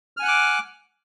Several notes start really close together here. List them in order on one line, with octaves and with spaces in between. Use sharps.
F6 G#5 F#5 F#6 D6